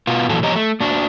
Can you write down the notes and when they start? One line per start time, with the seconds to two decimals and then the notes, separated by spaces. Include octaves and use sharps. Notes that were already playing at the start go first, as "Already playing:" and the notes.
0.07 B2 B3 F4
0.29 F2 A#2 E3 F#3 A4
0.43 F3 G4 C#5 D#5 A#5
0.56 A3
0.80 A#3 D4 F#4